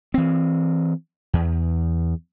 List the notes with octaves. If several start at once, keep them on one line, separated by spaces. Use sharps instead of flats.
E3 C4
E2